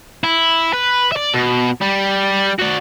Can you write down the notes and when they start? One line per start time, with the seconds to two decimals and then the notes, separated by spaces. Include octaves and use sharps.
0.24 E4
0.73 B4
1.12 D5 E5
1.34 B2
1.82 G3
2.59 F#4 D5